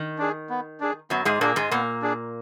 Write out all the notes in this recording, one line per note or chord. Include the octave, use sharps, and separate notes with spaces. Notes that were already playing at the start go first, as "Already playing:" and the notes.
Already playing: D#3
D4 G#4
B3
D4 G#4
F#2 F#3 B3
G#2 G#3
A#2 A#3 D4 G#4
G#2 G#3
A#2 A#3 B3
D4 G#4